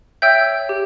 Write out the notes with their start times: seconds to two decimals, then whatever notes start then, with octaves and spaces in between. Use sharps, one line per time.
0.22 C#5 E5 G5 E6 G6
0.69 G4